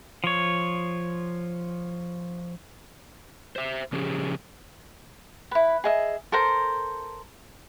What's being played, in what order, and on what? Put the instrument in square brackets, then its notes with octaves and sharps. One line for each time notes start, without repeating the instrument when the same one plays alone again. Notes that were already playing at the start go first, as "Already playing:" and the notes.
[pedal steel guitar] F3 C#5
[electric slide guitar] C5 E5
C#3 F3 C#4 G4 G#4
[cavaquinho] E4 B4
G#4 D#5 E5
A4 A#4 C5 A#5